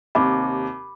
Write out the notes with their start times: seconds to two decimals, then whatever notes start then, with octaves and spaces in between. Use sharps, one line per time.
0.15 D#2 C3 B5 D6